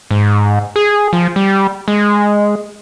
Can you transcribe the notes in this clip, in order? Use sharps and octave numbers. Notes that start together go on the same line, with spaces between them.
G#2
G#4
F3
G3
G#3